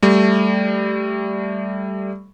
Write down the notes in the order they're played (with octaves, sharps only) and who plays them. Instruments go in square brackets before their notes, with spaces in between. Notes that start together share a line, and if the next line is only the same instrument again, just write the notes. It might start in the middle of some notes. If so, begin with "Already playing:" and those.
[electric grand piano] G3 A3